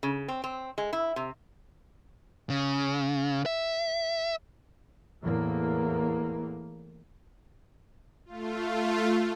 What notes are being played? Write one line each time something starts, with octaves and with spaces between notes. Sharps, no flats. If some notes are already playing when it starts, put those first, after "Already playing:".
C#3
C4
C4
G#3
E4
C3
C#3
E5
E2 A2 A#3
A3 F4